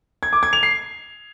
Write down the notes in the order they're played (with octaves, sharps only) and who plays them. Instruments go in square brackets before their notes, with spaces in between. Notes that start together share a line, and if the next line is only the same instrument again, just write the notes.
[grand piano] G#6
D6
G#6
F7
C7